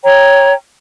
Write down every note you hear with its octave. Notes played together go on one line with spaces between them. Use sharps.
C#5 G5 A#5